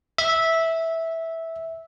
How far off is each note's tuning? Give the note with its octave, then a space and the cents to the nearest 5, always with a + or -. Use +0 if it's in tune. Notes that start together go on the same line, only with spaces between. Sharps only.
E5 -10